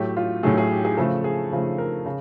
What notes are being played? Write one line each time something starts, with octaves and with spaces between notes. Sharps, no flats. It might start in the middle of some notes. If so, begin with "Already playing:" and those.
Already playing: A2 F#3 A3 G4
F4
A2 F#3 A3 G#4
G#4
G4
G#4
C#3 F3 A3 A4
G#4
C#3 F3 A3
A#4
C#3